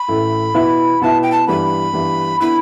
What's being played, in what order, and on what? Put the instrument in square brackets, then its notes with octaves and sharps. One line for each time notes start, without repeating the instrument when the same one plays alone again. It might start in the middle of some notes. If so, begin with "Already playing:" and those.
Already playing: [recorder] B5
[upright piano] A1 A2 A3 E4
B2 B3 E4 B4 E5
[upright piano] B2 B3 E4 B4 E5 [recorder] A5
[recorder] G5
A5
[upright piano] G2 E3 G3 B3 [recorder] B5
[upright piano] G2 E3 G3 B3
[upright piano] D3 B3 E4 [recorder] B5